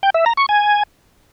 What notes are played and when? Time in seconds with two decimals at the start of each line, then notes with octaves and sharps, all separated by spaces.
0.03 G5
0.14 E5
0.26 A#5
0.37 C#6
0.49 G#5